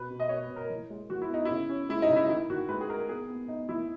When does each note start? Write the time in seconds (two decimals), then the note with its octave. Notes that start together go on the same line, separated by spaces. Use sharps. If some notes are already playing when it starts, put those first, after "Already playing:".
Already playing: B2 B4
0.10 B2
0.20 D#5
0.29 B2 C#5
0.43 B4
0.49 B2
0.56 A#4
0.70 E3
0.90 G#3
1.10 E3 F#4
1.22 E4
1.29 B3 D#4
1.45 C#3 E4
1.69 C#4
1.89 G#3 E4
2.02 D#4
2.10 C#3
2.16 E4
2.24 D#4
2.29 D#3 E4
2.50 D#3 F#4
2.69 G#3 B4
2.81 G#4
2.90 G#3 A#4
3.09 B3 G#4
3.29 B3
3.48 B3 D#4
3.69 E3 E4